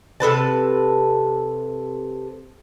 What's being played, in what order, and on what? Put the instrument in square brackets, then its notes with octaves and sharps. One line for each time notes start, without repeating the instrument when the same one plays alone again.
[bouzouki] C3 A4 B4 A5